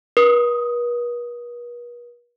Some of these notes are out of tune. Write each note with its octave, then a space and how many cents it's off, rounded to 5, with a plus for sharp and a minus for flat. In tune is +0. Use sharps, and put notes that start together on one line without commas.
B4 -45 D#6 +0